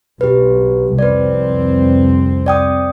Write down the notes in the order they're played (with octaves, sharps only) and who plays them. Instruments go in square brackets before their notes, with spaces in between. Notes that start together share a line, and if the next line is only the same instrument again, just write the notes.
[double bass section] B1 [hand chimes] G4 B4
[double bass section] C2 F2 C4 [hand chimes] B4 D5
[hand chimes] D5 G5 D#6